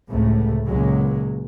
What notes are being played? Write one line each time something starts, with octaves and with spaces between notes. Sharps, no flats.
C#2 A2 C3 A3
C#2 A#2 F#3 G#3